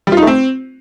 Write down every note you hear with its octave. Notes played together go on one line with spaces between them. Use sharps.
G3
F4
D#4
A3
C4